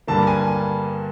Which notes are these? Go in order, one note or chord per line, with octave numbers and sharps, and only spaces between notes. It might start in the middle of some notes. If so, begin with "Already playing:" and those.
G2 D3 G3 A#3 A5
G#5
G#5